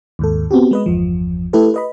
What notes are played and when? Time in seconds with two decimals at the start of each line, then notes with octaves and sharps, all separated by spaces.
0.19 D#2 G#2 A4
0.51 B3 C4 F#4 G4
0.71 G#3 B4 D#5
0.86 G1 E2 F3
1.53 A3 E4 G4 A4 B4
1.74 B4 D#5 B5